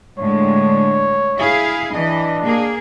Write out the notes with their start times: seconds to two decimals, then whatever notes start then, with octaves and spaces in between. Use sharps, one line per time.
0.19 A2 D3 G#3 C#5
1.36 E4 G#4 F5
1.93 E3 D4 D#5
2.42 A#3 G#4